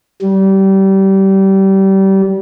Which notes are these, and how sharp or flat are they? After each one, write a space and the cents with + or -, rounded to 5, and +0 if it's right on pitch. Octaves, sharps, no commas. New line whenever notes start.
G3 -25